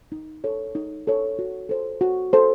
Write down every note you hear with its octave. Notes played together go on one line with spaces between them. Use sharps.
D#4
A4 C#5
D#4
A4 C#5
F#4
A4 C5
F#4
A4 C5